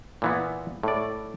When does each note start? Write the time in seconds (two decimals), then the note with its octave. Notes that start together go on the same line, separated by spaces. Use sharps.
0.22 A#2 E3 B3
0.83 A2 D5